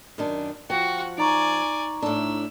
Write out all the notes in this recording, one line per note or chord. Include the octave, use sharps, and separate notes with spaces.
F#2 D#3 D4
F3 F#4 G5
D#4 D5 G#5 A#5 C#6
A2 D4 E6